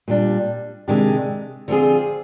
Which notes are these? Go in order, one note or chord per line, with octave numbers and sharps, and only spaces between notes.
A#2 G3 D4
C3 D#3 G#3 D4 G4
D3 F3 C4 F4 G#4